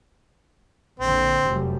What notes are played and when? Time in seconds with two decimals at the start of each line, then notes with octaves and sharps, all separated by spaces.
1.00 A#1 F2 D3 C4
1.45 F1 F#2 G3